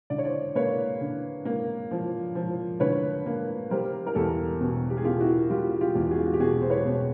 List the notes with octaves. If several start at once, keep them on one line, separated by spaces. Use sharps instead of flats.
D3 D5
C#5
C5 D5
A#3 B4 C#5
D3
A#3
F3
F3
D3 B4 C#5
A#3
G3 A#4 C5
A#4
E2 G4 A4
B2
G4
G#4
B2 F4 G4
E4 F#4
G3 F4 G4
F4 G4
E2
F#4 G#4
F4
F#4
G4
B2 F#4 G#4
C5
B4 C#5
B2